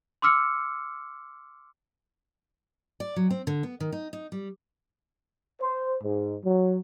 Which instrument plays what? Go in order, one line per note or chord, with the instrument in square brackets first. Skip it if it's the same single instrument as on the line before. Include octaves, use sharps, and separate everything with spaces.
[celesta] C6 D6 E6 F6 C#7
[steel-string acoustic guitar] D5
F#3
C4
D3
B3
D#3
D#4
D#4
G3
[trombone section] C5
G#2
F#3